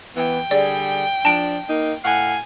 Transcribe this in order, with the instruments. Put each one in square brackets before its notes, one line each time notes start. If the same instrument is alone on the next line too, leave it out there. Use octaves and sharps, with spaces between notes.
[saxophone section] E3 B3 [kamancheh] G5
[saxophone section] D3 G3 G#4 [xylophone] D5
[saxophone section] F3 D4 [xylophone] A5 D7
[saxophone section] A#3 D#4
[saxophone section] A2 F5 F#5 [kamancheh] G#5